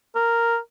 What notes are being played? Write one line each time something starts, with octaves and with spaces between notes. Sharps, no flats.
A#4